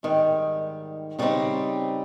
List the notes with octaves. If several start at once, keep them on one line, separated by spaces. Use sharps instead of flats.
G#2 D#3 G3
C#3 G3 C4 D#4